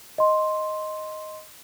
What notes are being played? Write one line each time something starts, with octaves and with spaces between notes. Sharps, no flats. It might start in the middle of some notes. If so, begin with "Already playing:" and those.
D#5 C6